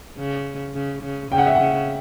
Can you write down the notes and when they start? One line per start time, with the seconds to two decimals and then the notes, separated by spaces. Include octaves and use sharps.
0.18 C#3
0.75 C#3
1.03 C#3
1.31 C#3 G5
1.38 F#5
1.46 E5
1.55 C#3 F#5